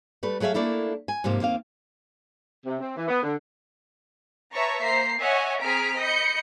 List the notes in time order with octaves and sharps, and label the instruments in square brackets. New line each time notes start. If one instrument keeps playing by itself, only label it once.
[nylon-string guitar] G3 A3 B4
F#3 A3 G#4 B4 E5 F5
A3 A#3 D4 E4 A4
G#5
G#2 C3 F3 A#3
D#2 A#3 C4 F5
[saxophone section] C3
C4
E3
B3
D3
[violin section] B4 C#5 E5 A5 A#5 C#6
A#3 C5 A#5 B6 C7
C#5 D#5 E5 F#5 G#5
C4 G#4 A#5 F6 B6 D7
D#5 B5 G6 C#7